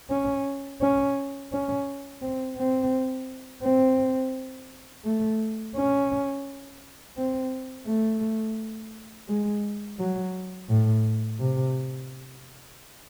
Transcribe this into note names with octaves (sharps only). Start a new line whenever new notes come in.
C#4
C#4
C#4
C4
C4
C4
A3
C#4
C4
A3
G#3
F#3
A2
C3